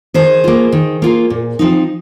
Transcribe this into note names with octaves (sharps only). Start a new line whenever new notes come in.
D#3 G#4 C5
A#3 F4
D#3
A#3 F4
A#2
F3 C4 D#4